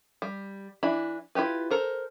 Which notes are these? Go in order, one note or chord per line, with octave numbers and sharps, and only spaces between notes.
G3
E3 D4 E4 B5
E4 F4 G4 B4
A4 A#4 C5